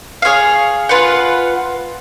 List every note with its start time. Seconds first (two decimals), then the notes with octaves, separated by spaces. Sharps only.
0.22 G#4 C#5 F5
0.89 F4 B4 F#5